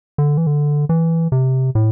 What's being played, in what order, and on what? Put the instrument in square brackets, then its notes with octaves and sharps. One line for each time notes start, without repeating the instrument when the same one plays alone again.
[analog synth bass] D3
E3
D3
E3
C3
A2